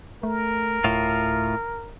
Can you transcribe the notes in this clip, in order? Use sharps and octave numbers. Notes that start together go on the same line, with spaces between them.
A3 A#4
D1 A2 F4